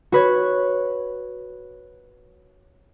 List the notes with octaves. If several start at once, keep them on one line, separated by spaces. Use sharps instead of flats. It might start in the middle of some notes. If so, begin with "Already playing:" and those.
F#4 B4 C#5